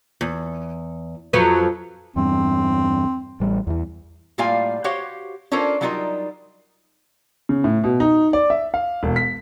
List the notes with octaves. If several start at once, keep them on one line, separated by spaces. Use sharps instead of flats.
E2
F2 F#3 B4
E2 G2 C4
A1 G3
E2 E3
A2 G3 A#3 F4 F5 G#5
F#4 G4 C5 C#5 F5 F#5
C#4 D4 F4 A4 A#4 C5
F#3 G3 D#4 F4 A#4 D#5
C#3
A2
B2
D#4
D5
E5
F5
E1
B6